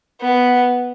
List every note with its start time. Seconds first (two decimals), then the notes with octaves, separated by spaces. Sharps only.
0.21 B3